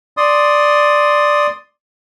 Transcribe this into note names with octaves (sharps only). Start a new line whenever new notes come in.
D5 C6 D#6